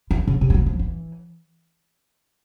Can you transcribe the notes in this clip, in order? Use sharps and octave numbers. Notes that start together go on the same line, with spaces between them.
E3
C#3
C3
F3
F#3
F3
E3